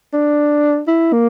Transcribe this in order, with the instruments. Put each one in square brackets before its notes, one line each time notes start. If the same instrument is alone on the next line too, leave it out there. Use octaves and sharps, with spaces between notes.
[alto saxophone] D4
E4
A#3